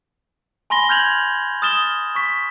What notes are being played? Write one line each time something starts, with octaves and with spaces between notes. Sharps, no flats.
G#5 B5 C6 A#6 G7
F6 G6 G#6 F7 F#7
D#6 F6 A6 E7 G7
C#6 B6